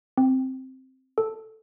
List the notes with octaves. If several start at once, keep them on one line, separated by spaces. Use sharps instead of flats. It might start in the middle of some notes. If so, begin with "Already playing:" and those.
C4
A4